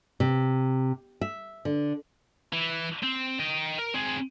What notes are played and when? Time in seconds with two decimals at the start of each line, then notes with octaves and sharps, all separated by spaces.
0.20 C3
1.21 E5
1.65 D3
2.53 E3
3.03 C4
3.39 D#5 G5
3.78 A#4
3.94 C4 G#4